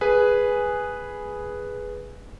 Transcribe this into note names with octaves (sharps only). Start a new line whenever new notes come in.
G#4 B4 G#5